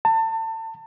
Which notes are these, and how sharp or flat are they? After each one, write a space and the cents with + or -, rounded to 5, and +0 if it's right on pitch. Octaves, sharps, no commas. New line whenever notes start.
A5 +30